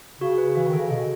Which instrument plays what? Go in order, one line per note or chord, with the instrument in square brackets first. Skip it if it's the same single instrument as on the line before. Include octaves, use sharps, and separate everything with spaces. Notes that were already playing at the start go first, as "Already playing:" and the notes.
[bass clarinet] C#3 [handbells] F#4
[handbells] B4
[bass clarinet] E3 [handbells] F#4
[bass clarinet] D#3 [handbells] A4
[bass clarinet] C#3
[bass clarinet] B2 [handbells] A4